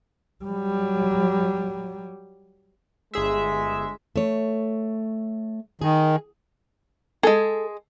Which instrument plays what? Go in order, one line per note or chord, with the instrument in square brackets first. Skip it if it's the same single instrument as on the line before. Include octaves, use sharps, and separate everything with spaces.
[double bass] F#3 G3
[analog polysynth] G1 G#4 E5 [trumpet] G#3
[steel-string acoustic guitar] A3 C#5
[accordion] D#3 [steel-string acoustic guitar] G#4
[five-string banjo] G#3 G#4 [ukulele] A4